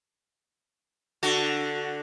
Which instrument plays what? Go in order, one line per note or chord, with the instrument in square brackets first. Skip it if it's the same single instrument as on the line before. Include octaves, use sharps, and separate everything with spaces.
[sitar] D3 F#4